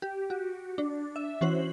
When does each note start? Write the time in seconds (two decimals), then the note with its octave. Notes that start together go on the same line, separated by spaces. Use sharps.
0.02 G4
0.30 F#4
0.78 D4
1.16 E5
1.41 E3 C#4 F#4 C5 F#7